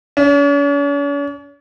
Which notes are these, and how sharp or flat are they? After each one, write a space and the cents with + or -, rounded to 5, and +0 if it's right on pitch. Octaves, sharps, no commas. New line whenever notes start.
C#4 +45